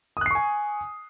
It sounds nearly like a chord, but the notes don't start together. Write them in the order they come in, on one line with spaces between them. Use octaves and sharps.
D#6 F#6 C7 C#6 G#5